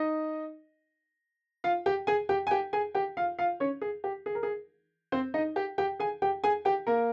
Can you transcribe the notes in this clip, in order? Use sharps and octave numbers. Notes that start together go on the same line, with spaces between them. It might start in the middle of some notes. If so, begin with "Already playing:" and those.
Already playing: D#4 D#5
F4 F5
G4 G5
G#4 G#5
G4 G5
G#5
G4 G5
G#4 G#5
G4 G5
F4 F5
F4 F5
C#4 C#5
G#4
G4
G#4
A#4
G#4
C4 C5
D#4 D#5
G4 G5
G4 G5
G#4 G#5
G4 G5
G#4 G#5
G4 G5
A#3 A#4